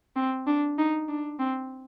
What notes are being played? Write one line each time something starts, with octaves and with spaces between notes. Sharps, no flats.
C4
D4
D#4
D4
C4